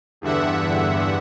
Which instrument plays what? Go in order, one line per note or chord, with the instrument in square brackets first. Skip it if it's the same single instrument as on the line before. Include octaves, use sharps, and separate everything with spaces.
[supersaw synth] E2 G2 D3 E5 F#5